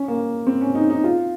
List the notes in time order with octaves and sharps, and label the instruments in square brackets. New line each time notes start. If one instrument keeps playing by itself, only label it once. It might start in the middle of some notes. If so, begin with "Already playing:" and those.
Already playing: [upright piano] C#4
A#3
C4
C#4
D#4
D#4
F4